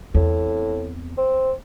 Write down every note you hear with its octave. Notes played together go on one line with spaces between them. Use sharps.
E2 A2 C4
C4